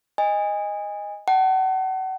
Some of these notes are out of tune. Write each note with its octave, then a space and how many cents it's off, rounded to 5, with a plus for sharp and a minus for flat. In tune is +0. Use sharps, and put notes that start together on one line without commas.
D#5 +0 G#5 -25
F#5 +35 A5 +0